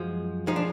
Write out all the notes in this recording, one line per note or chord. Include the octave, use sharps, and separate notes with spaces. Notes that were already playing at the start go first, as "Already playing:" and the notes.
Already playing: F#2 F3 G#3
F3 G#3 D#4
D4